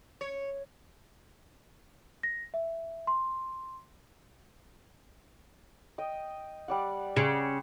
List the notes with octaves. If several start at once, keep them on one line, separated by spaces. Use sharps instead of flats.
C#5
A#6
E5
C6
D#5 G5
G3 D5 F#5
C#3 C6